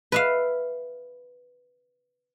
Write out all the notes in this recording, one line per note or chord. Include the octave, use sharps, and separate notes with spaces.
B4 E5 F5